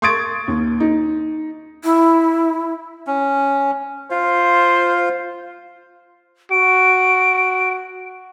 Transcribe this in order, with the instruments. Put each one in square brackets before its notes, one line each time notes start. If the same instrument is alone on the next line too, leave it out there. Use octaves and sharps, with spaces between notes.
[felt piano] C6 C#6 D#6 G#6 A6 D7
D#2
D#4
[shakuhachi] E4
[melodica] C#4
[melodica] F4 F5 [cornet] C5
[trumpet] F#4 [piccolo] D7